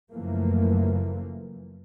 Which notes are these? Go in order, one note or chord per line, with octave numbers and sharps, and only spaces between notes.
F#1 F#2 E3 F3 A3 A#3